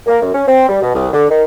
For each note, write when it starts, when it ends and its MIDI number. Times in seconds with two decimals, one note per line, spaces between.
0.07 0.18 58
0.22 0.30 42
0.34 0.43 61
0.48 0.68 60
0.69 0.78 55
0.82 0.92 47
0.94 1.07 36
1.13 1.25 50
1.30 1.43 51